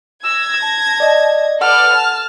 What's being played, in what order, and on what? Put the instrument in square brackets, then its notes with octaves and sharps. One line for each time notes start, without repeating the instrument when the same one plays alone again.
[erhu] E6 [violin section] G#6 A#6
[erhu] A5
[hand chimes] D5 D#5
[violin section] A4 B4 D5 [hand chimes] F#5 [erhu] F6
[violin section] A5